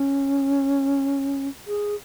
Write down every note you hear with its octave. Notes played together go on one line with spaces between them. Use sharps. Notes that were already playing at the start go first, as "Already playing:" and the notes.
Already playing: C#4
G#4